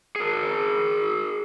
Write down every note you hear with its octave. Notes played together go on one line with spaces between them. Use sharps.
G#4 A#4